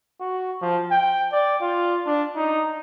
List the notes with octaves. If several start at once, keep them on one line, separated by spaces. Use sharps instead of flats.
F#4
F3
G5
D5
F4
D4
D#4